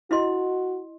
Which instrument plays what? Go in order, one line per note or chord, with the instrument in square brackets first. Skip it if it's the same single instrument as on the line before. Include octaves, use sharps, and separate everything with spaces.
[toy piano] E4 D#5 C6 [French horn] F#4